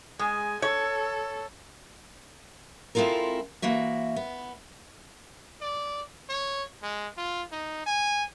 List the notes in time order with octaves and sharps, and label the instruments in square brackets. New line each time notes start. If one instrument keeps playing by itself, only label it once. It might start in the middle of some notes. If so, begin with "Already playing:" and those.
[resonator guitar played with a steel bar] G#3 [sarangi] G#5
[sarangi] A4 [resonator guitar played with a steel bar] C#5
[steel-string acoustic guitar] G#3 C4 E4 F4 A4 A#4
E3 A#3 F#4 E5
B3
[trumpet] D5
C#5
G#3
F4
D#4
G#5